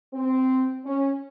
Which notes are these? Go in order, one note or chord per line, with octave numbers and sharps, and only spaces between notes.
C4
C#4